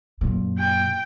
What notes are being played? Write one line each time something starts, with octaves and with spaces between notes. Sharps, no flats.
F#2 A#2
G5